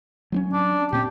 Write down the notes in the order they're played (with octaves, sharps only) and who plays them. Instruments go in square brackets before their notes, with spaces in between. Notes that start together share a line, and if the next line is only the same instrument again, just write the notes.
[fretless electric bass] F#3 C4 C#4
[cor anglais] D4
[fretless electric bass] A#2 C4 [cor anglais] G4